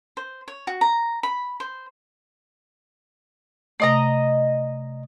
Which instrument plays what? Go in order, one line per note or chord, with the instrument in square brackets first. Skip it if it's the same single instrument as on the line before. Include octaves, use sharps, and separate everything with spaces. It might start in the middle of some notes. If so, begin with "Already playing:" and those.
[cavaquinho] C5
C#5
F#4
A#5
B5
C5
[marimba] C3 A3 [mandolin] D5 D#5 A#5